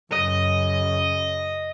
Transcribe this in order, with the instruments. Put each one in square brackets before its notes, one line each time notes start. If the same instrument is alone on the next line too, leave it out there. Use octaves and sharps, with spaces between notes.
[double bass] F#2 C#3 [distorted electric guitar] D#5